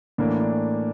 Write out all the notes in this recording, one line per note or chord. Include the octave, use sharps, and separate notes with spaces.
A2 E3 A#3 D4
D4